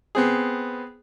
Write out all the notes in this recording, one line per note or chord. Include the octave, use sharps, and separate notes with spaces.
B3 C4 G#4